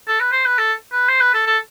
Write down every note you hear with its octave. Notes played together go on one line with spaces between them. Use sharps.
A4
B4
C5
B4
A4
B4
C5
B4
A4
A4